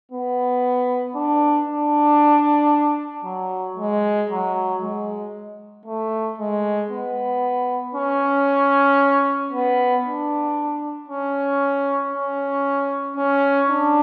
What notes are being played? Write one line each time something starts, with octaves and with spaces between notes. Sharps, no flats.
B3
D4
D4
F#3
G#3
F#3
G#3
A3
G#3
B3
C#4
B3
D4
C#4
C#4
C#4
D4